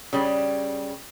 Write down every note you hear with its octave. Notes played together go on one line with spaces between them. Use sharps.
C#3 G3